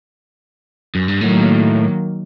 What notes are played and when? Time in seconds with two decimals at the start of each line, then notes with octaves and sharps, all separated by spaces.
0.95 F#2
1.08 G2
1.21 A2 D#3 F#3 A#3